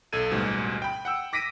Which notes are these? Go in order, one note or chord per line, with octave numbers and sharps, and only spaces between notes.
B1 A4 G#6 D#7
A1 D2 G#2 B2 G3
G5 B5
F#5 G5 E6
D6 A#6 B6 D7 D#7